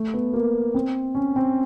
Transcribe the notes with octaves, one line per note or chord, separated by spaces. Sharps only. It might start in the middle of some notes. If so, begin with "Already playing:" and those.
Already playing: A3
B3
A#3
C4
C#4
C4